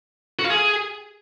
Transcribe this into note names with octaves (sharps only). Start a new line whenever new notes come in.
F#4
F5
G#4